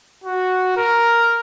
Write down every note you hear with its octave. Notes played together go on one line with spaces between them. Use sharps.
F#4
A#4